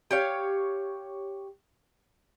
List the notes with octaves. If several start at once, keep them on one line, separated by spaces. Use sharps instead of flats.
G4 C#5 F5